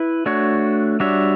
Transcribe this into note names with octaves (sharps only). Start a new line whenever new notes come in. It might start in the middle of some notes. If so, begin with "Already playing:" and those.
Already playing: E4 B4
A3 D4 F#4 C#5
G3 D4 F#4 C#5 E5